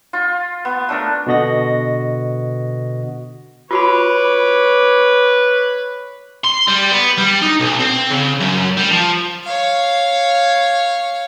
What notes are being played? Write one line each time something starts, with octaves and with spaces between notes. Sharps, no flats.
F4
B3
A3 D4 A#4
B2 D3 F#4 D#5 A#6
F4 F#4 B4 C#5 B5 D6
C6
G3
B3
G3
D#4
B1
C4
C#3
F#2
G3
F3
C#5 F5